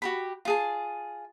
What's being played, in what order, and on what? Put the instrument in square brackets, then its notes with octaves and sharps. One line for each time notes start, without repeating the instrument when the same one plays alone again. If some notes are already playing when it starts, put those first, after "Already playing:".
[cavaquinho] F#4 G4 B5
F4 G#4 A5